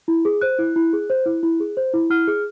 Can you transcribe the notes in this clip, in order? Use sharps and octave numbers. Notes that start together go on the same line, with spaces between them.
E4
G#4
C5 F#6
E4
E4
G#4
C5
E4
E4
G#4
C5
E4
E4 F6
G#4